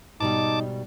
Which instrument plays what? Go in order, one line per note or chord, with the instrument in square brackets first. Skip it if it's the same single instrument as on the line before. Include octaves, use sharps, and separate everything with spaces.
[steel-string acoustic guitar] G#2 B2 G3 [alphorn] D#4 [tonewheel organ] A5 D6